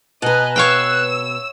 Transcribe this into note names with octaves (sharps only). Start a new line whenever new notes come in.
B2 B4 D#5 G#5 A#5 F#6
C#5 F5 G5 E6